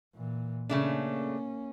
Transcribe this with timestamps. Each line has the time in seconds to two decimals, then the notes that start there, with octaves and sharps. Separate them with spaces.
0.15 A#2 E3
0.69 C#3 A3 A#3 C#4 D4